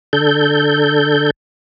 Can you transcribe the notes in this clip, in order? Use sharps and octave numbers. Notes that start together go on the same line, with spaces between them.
D3 A4 G6